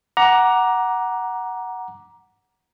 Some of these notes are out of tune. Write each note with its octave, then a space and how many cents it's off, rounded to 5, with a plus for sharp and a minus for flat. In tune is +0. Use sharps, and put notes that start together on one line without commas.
F#5 +5 A#5 +15 D6 +0